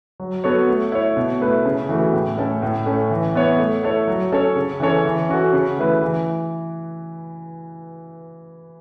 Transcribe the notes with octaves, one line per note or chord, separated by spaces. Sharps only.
F#3
B3 F#4 A4 C#5
A3
E4 C#5
B2
A3 E4 B4
C#3
E3 A3 F#4
A2
A3 C#4 A4
A2
A3 C#4
E3
B3 E4 C#5
A3
E4 A4 C#5
F#3
C#4 A4 C#5
C#3
E3 C#4 A4 C#5
E3
C#4 F#4 A4
C#3
E3 A3 E4 B4
E3